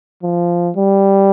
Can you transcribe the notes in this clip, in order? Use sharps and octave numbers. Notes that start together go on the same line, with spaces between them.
F3
G3